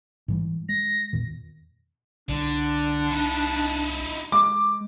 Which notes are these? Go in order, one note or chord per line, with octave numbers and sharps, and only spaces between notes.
G#2 E3 G3
G#3 A#6
E2 A#2 D#3
C2 D3 D4
D#4 E4
G#3 D6